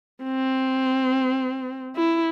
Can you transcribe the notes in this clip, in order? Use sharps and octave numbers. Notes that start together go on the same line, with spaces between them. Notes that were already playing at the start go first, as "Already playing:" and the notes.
C4
E4